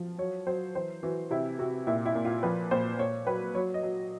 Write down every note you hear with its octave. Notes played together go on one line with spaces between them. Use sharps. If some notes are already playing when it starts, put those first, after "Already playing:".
Already playing: F3
F#3 C#5
F#3 C5
E3 C5
E3 F#4
C3 E4
C3 F#4
A#2 E4
E4
A#2
F4
F3 B4
A#2 C5
A#2 C#5
F#3 B4
F#3 C#5
D#5
F#3